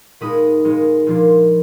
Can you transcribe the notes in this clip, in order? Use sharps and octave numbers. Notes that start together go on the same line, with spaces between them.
A#2 G#3 D#4 B5 D#6
A#2 G#3 D#4
A#2 F3 A#3 D4